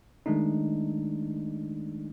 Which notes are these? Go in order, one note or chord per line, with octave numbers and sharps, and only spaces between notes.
D#3 G#3 A3 D4 D#4